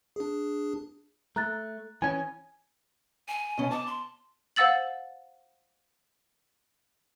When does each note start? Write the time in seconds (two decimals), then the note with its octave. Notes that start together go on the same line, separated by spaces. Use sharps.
0.16 D4 G#4
1.36 A3 A#5 F#6 A6
2.02 E3 C#4 G#5
3.28 G#5
3.58 B2 C#4
3.71 A5 D6
3.87 C6
4.56 C5 F5 F#5 E6 A6 F#7